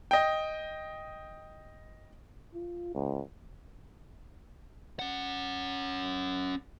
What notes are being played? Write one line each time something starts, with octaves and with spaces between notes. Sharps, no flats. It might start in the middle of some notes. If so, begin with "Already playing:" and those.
D#5 G5
F4
C#2
C#4 F#5